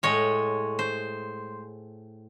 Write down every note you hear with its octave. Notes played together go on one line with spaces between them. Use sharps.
A2 G#3 C#5
C5